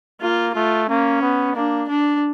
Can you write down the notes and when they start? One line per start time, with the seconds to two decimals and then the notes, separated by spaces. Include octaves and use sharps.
0.21 A#3 F4
0.55 A3 F4
0.89 A#3 C#4
1.21 B3
1.55 A#3 D4
1.89 D4